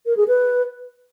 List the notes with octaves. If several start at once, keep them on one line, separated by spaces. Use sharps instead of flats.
A#4
G#4
B4